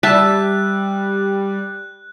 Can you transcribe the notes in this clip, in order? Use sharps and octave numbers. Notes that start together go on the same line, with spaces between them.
G3 E5 A5 F#6